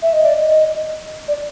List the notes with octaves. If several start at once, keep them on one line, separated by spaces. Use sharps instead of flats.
E5
D#5
D5
D#5
D5